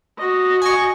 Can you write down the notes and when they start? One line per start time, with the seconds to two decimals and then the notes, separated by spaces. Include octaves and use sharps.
0.18 F#4 D#5
0.62 G#5 C#6